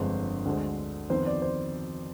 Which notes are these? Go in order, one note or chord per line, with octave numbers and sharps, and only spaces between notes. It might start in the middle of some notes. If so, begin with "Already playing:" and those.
Already playing: G1 F2 D3 G#3 C5
D2 D3 G#3 C4
F2 D#3 B3 C5
D5
C5